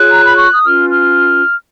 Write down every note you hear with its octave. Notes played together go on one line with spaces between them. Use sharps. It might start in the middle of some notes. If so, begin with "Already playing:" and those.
Already playing: F4 G#4 C#5 F#6
A#5
B5
C#6
D#6
C#4 F4 B4 F6
F6